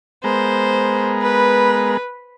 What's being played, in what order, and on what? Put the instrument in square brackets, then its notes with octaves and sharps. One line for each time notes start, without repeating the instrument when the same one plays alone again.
[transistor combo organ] G#3 B3 A#4 [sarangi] C5
[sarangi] B4